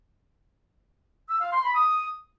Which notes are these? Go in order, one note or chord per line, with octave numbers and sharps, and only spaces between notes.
E6
F5
C6
B5
D#6